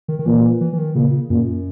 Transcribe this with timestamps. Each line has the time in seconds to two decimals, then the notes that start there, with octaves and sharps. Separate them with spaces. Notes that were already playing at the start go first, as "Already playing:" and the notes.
0.08 D#3
0.19 D#3
0.25 A#2 E3
0.61 E3
0.73 E3
0.78 D#3
0.95 A#2 C#3
1.30 F#2 A#2